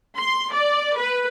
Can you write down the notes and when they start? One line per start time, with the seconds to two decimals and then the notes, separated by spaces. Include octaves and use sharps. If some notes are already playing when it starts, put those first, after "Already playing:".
0.18 C6
0.53 D5
0.98 B4